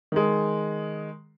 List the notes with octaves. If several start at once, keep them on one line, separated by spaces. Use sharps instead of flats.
D#3 G#3